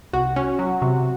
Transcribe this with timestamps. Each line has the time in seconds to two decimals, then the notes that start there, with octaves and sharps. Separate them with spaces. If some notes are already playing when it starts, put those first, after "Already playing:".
0.13 C2 F#4
0.36 C#4
0.59 F#3
0.82 C3